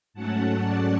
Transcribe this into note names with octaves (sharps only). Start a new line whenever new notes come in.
G#2 F#3 A3 C#4 F#5 A5
D5 F#5